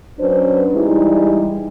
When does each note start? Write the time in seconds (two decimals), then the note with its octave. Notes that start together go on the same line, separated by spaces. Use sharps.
0.19 F#3 C#4 D4 B4 C5
0.73 E3 G3 G#3 D#4 E4